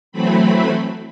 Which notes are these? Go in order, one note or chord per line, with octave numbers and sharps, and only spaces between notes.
E3 F#3 A3 C4 B5